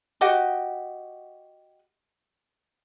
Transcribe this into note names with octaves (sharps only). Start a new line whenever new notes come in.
F#4 G4 D#5 F#5